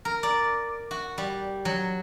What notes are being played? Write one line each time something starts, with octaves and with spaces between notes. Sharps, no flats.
A#4
D5
F#4
G3
F#3